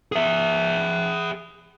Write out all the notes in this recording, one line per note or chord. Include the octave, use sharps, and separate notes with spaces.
G#4 E5